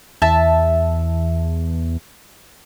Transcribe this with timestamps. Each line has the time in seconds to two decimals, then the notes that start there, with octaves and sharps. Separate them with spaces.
0.22 E2 E5 A5